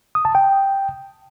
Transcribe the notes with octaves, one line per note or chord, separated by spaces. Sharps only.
D#6
A5
G5